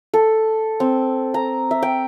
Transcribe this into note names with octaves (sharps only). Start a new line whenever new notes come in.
A4
C4
A#5
E5
G5